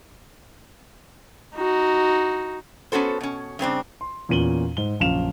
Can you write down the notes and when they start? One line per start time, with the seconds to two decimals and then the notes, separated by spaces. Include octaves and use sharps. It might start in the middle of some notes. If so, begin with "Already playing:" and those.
1.55 D#4 F#4
2.92 B3 C#4 F#4 A4 C5
3.21 B2 C#4
3.59 G2 C#3 C4 D4
4.01 C6
4.29 E2 A#2 C#4 D#7 F#7 G7
4.77 G#2 G7
5.00 A#1 F#2 C#3 F5 E7 F7